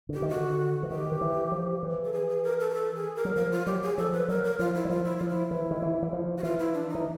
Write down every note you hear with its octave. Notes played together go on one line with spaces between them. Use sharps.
D3 G4
D#3
F#4
D3
E3
D#3 G4
D#3
E3
F3
E3
A4
G#4
G#4
A#4
A4
A#4
A4
G#4
A#4
F#3
F3 A#4
F4
F#3 G4
G#4
F3 A4
B4
F#3 A#4
A#4
F3 F4
E4
F#3
F3 F4
E4
F3 F4
E4
E3
D#3
E3
E3
F3
F#4
E3 F4
E4
D4
D#4
E3